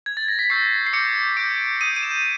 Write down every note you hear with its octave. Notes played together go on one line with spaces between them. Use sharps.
G#6
A6
A#6
B6
C#6 E6 G6 C7
C7
D6 G6 C#7
D6 G6 D7
D#6 G6 D#7
D#7
E7